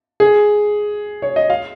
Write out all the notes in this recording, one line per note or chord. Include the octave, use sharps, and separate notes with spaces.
G#4
C#5
D#5
F5